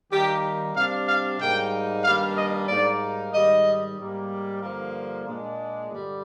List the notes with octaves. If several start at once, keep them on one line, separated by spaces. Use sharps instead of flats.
D#3 G3 A#3 D#4 G4
C3 G3 D4 F5
F5
G#2 G3 A#3 D#4 G5
G2 D#3 G3 A#3 D4 F5
D#5
G#2 G3 A#3 D#4 D5
G#2 D#3 G3 D#5
G#2 G3 A#3
G2 D3 F3 A#3
A#2 G#3 D4
G2 D3 G3